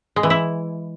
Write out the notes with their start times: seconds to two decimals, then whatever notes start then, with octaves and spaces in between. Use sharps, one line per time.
0.16 G#3
0.23 E3
0.30 E4